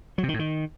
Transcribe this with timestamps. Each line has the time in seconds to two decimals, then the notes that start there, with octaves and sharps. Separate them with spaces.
0.18 F#3
0.23 C3
0.29 D#3
0.34 A2
0.39 D#3